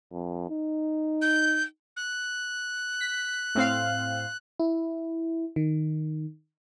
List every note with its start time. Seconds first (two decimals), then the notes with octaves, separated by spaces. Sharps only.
0.12 F2
0.50 D#4
1.22 G6
1.96 F#6
3.01 B6
3.55 A2 C4 F5
4.60 E4
5.56 D#3